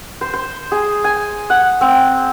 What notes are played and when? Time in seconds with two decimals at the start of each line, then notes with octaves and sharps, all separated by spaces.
0.21 C5
0.34 C5
0.72 G#4
1.04 G#5
1.50 F#5
1.81 C4